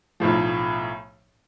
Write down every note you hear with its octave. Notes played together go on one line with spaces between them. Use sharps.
B1 A2 F3